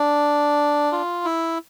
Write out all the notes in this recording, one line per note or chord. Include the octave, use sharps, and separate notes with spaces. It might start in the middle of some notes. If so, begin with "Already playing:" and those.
Already playing: D4
F4
E4